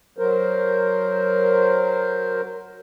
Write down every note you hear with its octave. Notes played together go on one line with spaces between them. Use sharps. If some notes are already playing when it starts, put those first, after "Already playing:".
F#3 A#4 C5